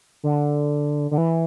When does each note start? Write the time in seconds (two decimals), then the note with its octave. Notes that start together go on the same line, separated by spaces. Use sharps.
0.23 D3
1.11 D3
1.18 E3